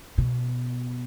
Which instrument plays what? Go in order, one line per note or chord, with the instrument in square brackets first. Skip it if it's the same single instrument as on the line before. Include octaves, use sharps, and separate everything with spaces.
[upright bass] B2